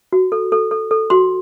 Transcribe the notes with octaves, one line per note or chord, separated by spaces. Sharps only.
F#4
A4
A4
A4
A4
F#4 C6